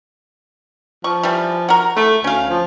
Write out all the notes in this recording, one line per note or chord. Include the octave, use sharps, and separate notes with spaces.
F3 C#6
E3 G3
F#4 A#4
A3 E4
D2 C#4 F5
F3